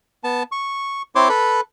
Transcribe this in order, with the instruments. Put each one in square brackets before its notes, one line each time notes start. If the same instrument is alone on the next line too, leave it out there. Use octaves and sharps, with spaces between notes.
[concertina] B3 A5
C#6
C4 E4 C5 C#5 C6 D6
A4 B4 B5